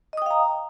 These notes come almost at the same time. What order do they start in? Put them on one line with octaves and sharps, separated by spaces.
D#5 D#6 G5 F5 A#5